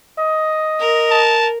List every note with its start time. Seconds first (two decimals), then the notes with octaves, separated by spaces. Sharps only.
0.19 D#5
0.80 A#4
1.11 A5